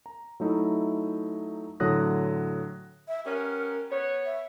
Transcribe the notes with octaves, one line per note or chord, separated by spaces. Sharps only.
A#5
F#3 A3 D#4 E4
A2 D3 F#3 D#6 F#6 A#6
E5
G3 B3 C#4 A#4
B3 C#5
E5